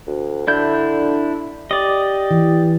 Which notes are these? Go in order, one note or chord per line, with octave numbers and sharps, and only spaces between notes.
D2
D3 D4 E4 G6
G4 D5 D#5
E3